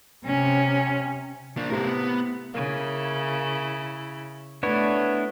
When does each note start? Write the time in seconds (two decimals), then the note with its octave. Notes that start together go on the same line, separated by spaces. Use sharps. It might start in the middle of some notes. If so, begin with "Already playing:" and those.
0.25 C3 C#4
1.57 A#3 D4
1.70 A2 C3 B3 A#4
1.87 B3
2.54 C#3 A#3 E4
4.63 A3 B3 D4 E4 C#5